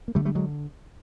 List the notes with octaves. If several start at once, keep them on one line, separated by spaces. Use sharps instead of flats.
A#3
D3 G3 A3
G3 A3
D3 F#3 G#3